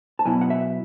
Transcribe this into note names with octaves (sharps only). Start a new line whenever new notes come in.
A5
B2 F#3 B3 E4 G#5
F#5
E5